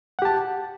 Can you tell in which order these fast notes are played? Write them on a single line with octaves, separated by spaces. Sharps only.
F#5 G4 A5